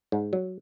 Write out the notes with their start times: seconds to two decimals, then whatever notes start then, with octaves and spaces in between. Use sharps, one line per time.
0.12 G#2
0.33 F#3